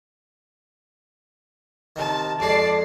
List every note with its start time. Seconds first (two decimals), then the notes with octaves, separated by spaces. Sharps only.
1.96 C3 D#3 A5
2.40 F2 G#3 D5 A5 C7